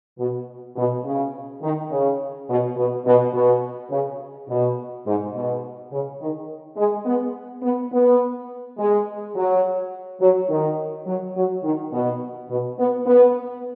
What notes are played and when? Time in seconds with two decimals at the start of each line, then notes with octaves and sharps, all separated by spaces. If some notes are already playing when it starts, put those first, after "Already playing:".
0.18 B2
0.76 B2
1.04 C#3
1.61 D#3
1.91 C#3
2.48 B2
2.76 B2
3.06 B2
3.33 B2
3.90 C#3
4.48 B2
5.06 G#2
5.34 B2
5.91 C#3
6.20 D#3
6.76 G#3
7.05 B3
7.62 B3
7.92 B3
8.77 G#3
9.34 F#3
10.20 F#3
10.48 D#3
11.06 F#3
11.35 F#3
11.63 D#3
11.92 B2
12.48 B2
12.78 B3
13.05 B3